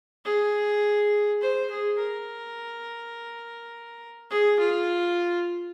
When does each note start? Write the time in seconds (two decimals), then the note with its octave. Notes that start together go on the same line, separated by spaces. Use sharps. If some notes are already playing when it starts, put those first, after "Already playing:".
0.25 G#4
1.42 C5
1.71 G#4
1.99 A#4
4.31 G#4
4.59 F4